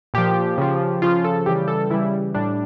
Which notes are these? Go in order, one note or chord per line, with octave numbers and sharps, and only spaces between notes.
A#2 F3 G4
C#3 F3
C#3 F3 F4
A4
C#3 E3 G3 G4
A4
C#3 E3 G3 E4
A2 G3 D4